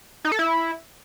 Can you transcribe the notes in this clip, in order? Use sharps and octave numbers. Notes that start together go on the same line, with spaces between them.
D#4
A4
E4